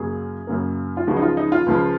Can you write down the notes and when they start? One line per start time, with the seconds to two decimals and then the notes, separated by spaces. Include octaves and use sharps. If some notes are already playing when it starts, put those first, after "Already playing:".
Already playing: F#2 C#3 F#3 A#3 G#4
0.47 F#2 C#3 F#3 A#3
0.97 F4
1.07 C#2 C#3 F3 G#3 F#4
1.16 D#4
1.22 F4
1.37 D#4
1.52 F4
1.66 C#2 C#3 F3 G#3